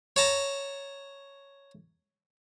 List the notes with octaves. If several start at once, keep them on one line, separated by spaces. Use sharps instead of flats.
C#5 A5 A#5